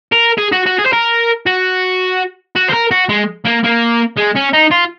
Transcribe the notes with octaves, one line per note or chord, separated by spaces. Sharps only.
A#4
G#4
F#4
F#4
G#4
C5
A#4
F#4
F#4
C5
A#4
F#4
G#3
A#3
A#3
G#3
C#4
D#4
F4